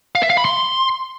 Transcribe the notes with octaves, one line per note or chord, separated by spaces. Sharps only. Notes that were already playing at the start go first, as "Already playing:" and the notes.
F5
E5
F5
B5
C6